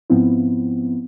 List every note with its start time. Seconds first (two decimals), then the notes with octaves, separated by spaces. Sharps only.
0.10 G#2 F3 B3 C4 E4